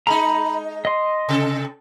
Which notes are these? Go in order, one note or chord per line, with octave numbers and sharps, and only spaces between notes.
G#3 D#4 A#5 B5
D#5 C6
C3 A4